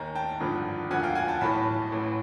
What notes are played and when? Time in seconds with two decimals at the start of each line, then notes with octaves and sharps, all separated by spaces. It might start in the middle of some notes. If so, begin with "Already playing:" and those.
Already playing: D#2 D#3 G#5 A#5
0.15 G5 A5
0.40 G#1 G2 D3 F3
0.90 E1 D2 D3 F3 F#5 G#5
1.03 F5 G5
1.15 F#5 G#5
1.28 G5 A5
1.41 B1 A2 E3 A5 B5
1.92 A1 A2 E3